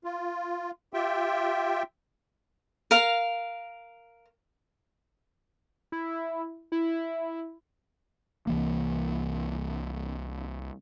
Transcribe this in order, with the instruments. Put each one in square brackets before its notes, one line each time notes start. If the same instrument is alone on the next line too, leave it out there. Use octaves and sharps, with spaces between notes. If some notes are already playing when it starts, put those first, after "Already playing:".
[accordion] F4
F4 G4 E5 G5
[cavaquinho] A#4 F5
[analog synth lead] E4
E4
[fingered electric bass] C2 E3 A#3